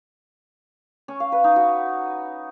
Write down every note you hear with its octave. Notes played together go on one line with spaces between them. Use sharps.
C#4
F5
B4
D#4
F#4